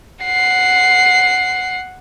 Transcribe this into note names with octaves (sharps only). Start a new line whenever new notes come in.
F#5 C7